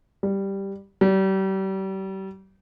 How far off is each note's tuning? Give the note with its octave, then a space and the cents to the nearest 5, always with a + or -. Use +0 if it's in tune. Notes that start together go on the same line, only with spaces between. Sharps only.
G3 +0
G3 -35